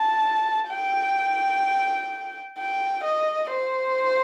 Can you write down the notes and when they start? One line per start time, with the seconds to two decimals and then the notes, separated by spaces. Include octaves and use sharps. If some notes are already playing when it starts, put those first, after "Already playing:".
Already playing: A5
0.69 G5
2.58 G5
3.04 D#5
3.52 C5